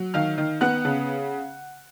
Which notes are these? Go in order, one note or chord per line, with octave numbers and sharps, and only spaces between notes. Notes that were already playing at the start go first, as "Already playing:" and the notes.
Already playing: F#3
D#3 F5 F6
D#3
B3 F#5 F#6
C#3